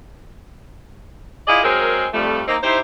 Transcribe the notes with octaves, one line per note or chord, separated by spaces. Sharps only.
E4 F4 G#4 D5 D#5 F5
F#3 G#3 C4 G#4 A#4
F2 G3 A3
A#3 C4 D#4
D#4 E4 G4 C5